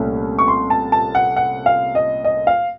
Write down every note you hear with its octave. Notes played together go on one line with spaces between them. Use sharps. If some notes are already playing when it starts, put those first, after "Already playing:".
Already playing: C2 A#2 A3 C#4
C#6
C6
A5
A5
F#5
F#5
F5
D#5
D#5
F5